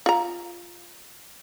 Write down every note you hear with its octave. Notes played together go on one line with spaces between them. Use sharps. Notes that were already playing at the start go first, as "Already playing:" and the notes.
F4 A#5